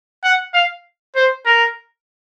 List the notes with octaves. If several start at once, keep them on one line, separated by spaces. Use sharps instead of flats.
F#5
F5
C5
A#4